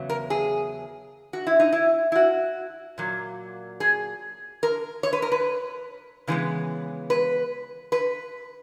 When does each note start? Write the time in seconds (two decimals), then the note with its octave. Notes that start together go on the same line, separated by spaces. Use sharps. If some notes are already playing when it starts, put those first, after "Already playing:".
Already playing: E2 C#3 F#3 B3
0.09 A#4
0.30 G#4
1.33 F#4
1.47 E4
1.60 D#4
1.72 E4
2.12 E4
2.16 F#4
2.98 A#2 F#3 A#3
3.80 G#4
4.63 A#4
5.03 C#5
5.13 B4
5.22 A#4
5.32 B4
6.27 C#3 E3 G#3 B3
7.10 B4
7.92 B4